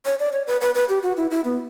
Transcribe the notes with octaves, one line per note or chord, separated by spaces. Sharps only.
C#5
D5
C#5
B4
B4
B4
G4
F#4
E4
E4
B3